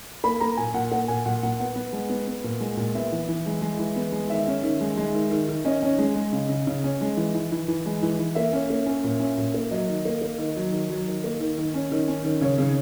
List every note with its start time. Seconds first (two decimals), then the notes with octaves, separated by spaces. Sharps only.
0.24 A#3 B5
0.40 A#3 A#5
0.57 A#2 G#5
0.74 A#2 F#5
0.92 A#3 F#5
1.08 A#2 G#5
1.25 A#2 F#5
1.43 A#2 F#5
1.60 B3 F#5
1.76 B3
1.93 G#3
2.09 B3
2.27 B3
2.44 A#2
2.60 G#3
2.77 A#2
2.95 B3 E5
3.12 E3
3.29 E3
3.46 G#3
3.62 G#3
3.79 E3
3.96 B3
4.12 G#3
4.30 D#3 E5
4.47 C#4
4.63 D#3
4.81 G#3
4.97 G#3
5.14 D#3
5.31 D#3
5.49 D#3
5.65 C#4 D#5
5.82 C#4
5.98 G#3
6.15 G#3
6.33 C#3
6.49 C#3
6.67 C#3
6.84 C#4
7.01 G#3
7.17 E3
7.34 E3
7.52 E3
7.68 E3
7.86 G#3
8.03 E3
8.19 E3
8.35 A#3 E5
8.53 C#4
8.70 A#3
8.86 C#4
9.04 A#2
9.20 C#4
9.38 A#2
9.54 A#3
9.71 F#3 D#5
9.89 D#3
10.05 A#3
10.22 A#3
10.38 D#3
10.56 F#3
10.72 D#3
10.90 F#3
11.07 D#3
11.24 A#3
11.40 D#3
11.58 D#3
11.74 C#4
11.92 D#3
12.08 C#4
12.25 D#3
12.41 C#3 C#5
12.58 C#3